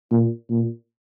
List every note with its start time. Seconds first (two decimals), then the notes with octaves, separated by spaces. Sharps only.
0.11 A#2
0.50 A#2